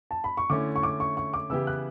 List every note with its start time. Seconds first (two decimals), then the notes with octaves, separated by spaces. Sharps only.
0.11 A5
0.24 B5
0.37 C#6
0.50 D3 A3 C#4 E4 D6
0.76 C#6
0.83 D6
1.00 C#6
1.17 C#6
1.34 D6
1.50 C#3 E3 B3 E4 G4 E6
1.67 F#6